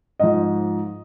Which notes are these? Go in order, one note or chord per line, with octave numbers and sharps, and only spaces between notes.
G#2 F3 D#5